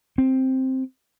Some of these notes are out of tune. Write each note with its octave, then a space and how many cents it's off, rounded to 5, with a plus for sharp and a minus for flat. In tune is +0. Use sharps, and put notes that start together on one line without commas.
C4 +5